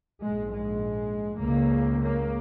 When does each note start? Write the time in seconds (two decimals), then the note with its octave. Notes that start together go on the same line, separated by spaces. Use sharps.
0.23 A#1 G#2 G#3
0.53 G#3
1.41 C#2 C#3 A#3
2.02 A#3